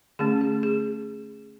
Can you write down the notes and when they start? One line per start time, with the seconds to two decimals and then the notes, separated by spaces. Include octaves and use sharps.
0.19 D3 A3 C#4 G#4
0.41 G#4
0.63 G#4